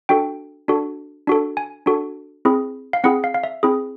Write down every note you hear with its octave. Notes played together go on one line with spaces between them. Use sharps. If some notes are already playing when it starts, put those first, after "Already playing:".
D4 F#4 A4 G5
D4 F#4 A4
D4 F#4 A4
G#5
D4 F#4 A4
C4 E4 G#4
F5
C4 E4 G#4 F#5
F5
F5
E5
C4 E4 G#4